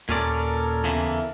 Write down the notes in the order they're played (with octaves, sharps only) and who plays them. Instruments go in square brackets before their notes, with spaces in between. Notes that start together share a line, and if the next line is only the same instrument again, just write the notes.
[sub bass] D#2 [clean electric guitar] A#2 C#4 D5 [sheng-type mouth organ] A4 A#4
[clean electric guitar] E2 C#3 E3